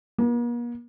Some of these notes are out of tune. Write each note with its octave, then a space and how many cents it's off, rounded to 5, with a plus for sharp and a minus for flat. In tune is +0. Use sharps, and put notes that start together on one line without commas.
A#3 +45